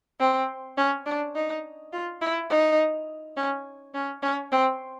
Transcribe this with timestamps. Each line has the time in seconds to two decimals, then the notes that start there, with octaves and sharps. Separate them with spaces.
0.20 C4
0.77 C#4
1.06 D4
1.35 D#4
1.92 F4
2.21 E4
2.50 D#4
3.37 C#4
3.94 C#4
4.23 C#4
4.52 C4